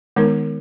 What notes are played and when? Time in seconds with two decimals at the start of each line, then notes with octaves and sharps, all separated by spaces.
0.16 D#3 G#3 B3 D#4 A#4